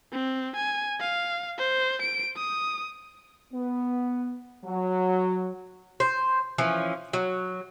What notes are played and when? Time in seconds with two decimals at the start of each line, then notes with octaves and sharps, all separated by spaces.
0.12 C4
0.56 G#5
1.00 F5
1.58 C5
2.02 D7
2.37 D#6
3.52 B3
4.63 F#3
6.00 C5
6.58 E3 F3 C#4
7.13 F#3